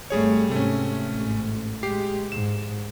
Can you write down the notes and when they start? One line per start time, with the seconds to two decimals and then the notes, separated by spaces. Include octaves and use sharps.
0.10 G#1 G3 A3 G#4 C#5
0.51 G#2 C3 A3 C#4
1.11 A1 G#2
1.83 G#3 G4 C7
2.32 G#2 E7